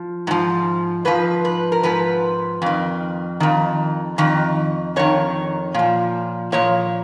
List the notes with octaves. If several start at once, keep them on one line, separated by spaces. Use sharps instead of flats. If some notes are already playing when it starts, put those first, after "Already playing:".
Already playing: F3
G#2 F3
G#2 F3 B4
B4
A#4
G#2 F3 B4
F2 D#3
F2 D#3
F2 D#3
F2 D#3 C#5
A#2 F3
A#2 F3 C#5